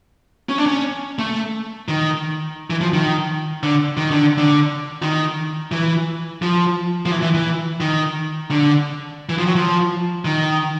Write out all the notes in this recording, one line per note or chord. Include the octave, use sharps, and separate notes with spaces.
C#4
D4
C#4
A3
D#3
E3
F3
D#3
D3
D#3
D3
D3
D#3
E3
F3
F3
E3
E3
E3
D#3
D3
E3
F3
F#3
F3
D#3